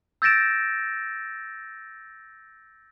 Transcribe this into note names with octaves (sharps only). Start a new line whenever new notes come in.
E6 G6 A6 A#6 D7 E7